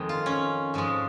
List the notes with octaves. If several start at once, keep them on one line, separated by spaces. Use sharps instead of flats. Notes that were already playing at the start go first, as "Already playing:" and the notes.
Already playing: F2 D#3 G#3
F4
C#4
G#2 F3 G#3